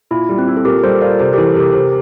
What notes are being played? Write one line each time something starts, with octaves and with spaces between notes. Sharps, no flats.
A#2 E4
G3
C4
E4
A4
A#2 G4 A#4
G3 A4 C5
F4 A#4 D5
C3 A4 C5
E3 G4 A#4
A4 C5
C3 G4 A#4
C3